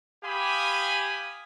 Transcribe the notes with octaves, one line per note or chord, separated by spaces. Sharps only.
G4 F5 G#5 B5 D#6